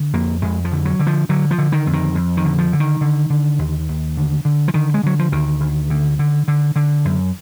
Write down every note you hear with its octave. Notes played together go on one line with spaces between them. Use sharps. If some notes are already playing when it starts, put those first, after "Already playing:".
Already playing: D3
F2 A#3
F2 G#3
F3
D3
F#3
D3
F3
D3 F#3
F3
D3
D#3
F2
D#3
F2
D#3
D3
F3
D3
D#3
D3
D3
D#2
D#2
D3
D3
F3
D3 D#3
G#3
D3 F#3
F3
D2 D#3
D2
D3
D3
D3
D3
F#2